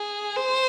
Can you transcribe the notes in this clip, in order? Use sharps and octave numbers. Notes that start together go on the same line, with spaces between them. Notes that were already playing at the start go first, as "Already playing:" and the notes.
Already playing: G#4
C5